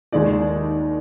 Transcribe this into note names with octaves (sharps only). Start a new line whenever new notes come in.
D#2 D#3 G#3 D#4 D5